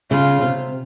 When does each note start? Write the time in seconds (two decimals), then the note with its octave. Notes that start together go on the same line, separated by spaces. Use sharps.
0.11 C#3 F4
0.42 C3